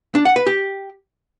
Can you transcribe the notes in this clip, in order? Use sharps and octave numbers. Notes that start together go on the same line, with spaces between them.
D4
F#5
B4
G4